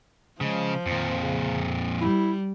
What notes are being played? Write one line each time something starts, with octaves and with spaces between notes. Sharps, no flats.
C#3 F3 G#3
F2 A#2 D#3
C#3
G3 E4